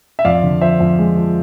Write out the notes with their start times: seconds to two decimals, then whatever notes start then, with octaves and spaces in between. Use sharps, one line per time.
0.19 E5
0.25 F2 D5 F5
0.43 D3
0.61 F3 C5 E5
0.80 F2
0.99 G#3
1.17 F3